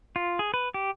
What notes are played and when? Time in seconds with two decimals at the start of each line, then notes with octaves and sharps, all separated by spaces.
0.16 F4
0.39 G#4
0.54 B4
0.74 G4